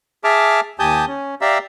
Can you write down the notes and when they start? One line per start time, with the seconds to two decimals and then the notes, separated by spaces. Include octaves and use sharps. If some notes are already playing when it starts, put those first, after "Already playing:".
0.24 G#4 E5 A5 D6 F6
0.79 D#2 G4 G#5 A5 D#6 G6
1.07 C#4
1.41 G4 D5 E5 F5 A#5 E6